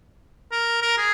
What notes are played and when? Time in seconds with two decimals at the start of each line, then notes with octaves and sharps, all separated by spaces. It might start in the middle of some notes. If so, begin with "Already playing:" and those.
0.52 A#4
0.82 A#4
0.98 G#4